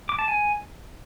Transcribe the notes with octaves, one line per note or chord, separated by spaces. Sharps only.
D6
A5
G#5